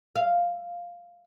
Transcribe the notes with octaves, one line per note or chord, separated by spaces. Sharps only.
F5